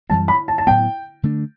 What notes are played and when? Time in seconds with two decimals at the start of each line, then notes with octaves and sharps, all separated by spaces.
0.10 F#2 E3 G3 C4 A5
0.28 B5
0.48 A5
0.58 A5
0.67 A2 F#3 B3 G5
1.23 D3 A3 D4